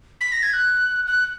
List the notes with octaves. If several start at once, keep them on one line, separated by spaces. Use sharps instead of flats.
B6
A#6
G#6
F#6
F#6